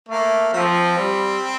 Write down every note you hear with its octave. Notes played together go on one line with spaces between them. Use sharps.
A3 A#3
F3 A3 C4
G3